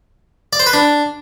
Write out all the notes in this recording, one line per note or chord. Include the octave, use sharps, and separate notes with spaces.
D5
C5
B4
D4